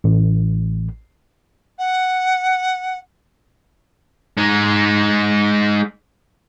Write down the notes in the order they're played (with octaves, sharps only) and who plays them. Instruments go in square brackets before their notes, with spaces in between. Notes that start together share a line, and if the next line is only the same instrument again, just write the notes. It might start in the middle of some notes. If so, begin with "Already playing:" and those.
[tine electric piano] A1
[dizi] F#5
[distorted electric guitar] G#3 D#4